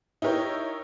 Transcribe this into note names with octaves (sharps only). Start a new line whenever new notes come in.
D#4 E4 G4 A#4 C#5